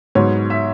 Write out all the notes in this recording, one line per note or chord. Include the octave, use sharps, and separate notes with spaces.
G#2 F#3 B3 C#5
E5